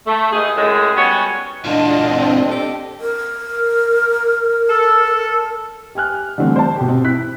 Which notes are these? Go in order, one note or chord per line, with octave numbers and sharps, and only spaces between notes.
A3
D#2 G#2 D#4 G#4
F#2 A2 G#3
G3 B3 C#4 F#4 C#5
A#2 D3 E3 D4 F4 D#5
C4
G4 A4
A#4
A4
G4 G#5 F6 F#6
D3 E3 G3 A3 C4
C5 A5
B2 G4
C4
E4 F#6 B6